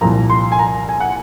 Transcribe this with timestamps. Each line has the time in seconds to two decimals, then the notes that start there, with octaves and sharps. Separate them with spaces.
0.01 C2 A#2 F3 A#5
0.30 C6
0.52 G#5
0.59 A#5
0.89 G#5
1.00 F#5